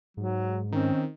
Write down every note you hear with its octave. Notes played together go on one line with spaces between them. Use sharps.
G#2 F#3
D#3 C4 C#4